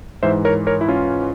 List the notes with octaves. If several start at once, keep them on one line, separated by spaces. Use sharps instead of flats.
G#2 E3 C5 E5
A#4 C#5
A#4 C#5
E4
C#4 F4